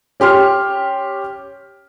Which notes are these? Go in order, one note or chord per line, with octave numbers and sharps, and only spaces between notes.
C#4 G4 C6 F6